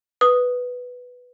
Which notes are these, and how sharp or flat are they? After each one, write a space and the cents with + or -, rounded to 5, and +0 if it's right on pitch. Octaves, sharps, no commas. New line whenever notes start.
B4 +0 D#6 +0